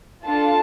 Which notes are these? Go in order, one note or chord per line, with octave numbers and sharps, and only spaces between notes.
D4 F4 A4 A5